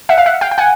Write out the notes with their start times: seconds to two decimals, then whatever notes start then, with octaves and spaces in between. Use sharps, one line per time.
0.09 E5 F#5
0.18 F5
0.26 E5 F#5
0.41 F5 G5
0.51 G5
0.58 F#5 G#5